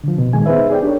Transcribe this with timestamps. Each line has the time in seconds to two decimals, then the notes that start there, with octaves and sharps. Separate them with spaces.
0.04 D3 F3
0.18 B2
0.33 A#2 D#3 G#3 G#5
0.46 B3 D#4 G#4 B4 C5 E5
0.70 G#4 D5 G5
0.83 D4 G4 A4 A#4 C#5